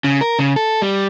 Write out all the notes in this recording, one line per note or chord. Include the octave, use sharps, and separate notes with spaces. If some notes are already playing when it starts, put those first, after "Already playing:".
C#3
A#4
C#3
A4
G3